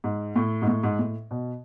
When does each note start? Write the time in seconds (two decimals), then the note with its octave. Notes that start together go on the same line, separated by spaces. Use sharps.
0.04 G#2
0.36 A2
0.62 G#2
0.67 A2
0.83 G#2
0.99 A2
1.31 B2